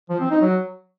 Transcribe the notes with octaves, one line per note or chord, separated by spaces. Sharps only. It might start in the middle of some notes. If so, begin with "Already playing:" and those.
F3
C4
D#4
F#3